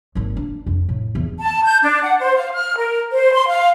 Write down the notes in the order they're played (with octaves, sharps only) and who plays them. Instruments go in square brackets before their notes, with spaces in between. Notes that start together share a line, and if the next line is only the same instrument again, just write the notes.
[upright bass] G#1 D#2
D4
F2
A2
E2
[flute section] A5
G6
D4
F#5
C5
F5
F6
A#4
C5
C6
F5